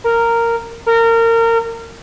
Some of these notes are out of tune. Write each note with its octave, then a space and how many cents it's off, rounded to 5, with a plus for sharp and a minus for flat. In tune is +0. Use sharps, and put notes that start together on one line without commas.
A#4 -10
A#4 -25